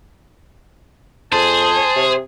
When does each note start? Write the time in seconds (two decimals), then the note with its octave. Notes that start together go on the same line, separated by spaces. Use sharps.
1.32 F2 G#4 C5 A5
1.96 C3